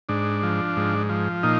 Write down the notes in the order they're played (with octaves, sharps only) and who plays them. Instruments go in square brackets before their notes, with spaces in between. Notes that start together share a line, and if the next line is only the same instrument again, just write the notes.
[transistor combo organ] G#2 D4
F3
G#2
F3
A#2 D#4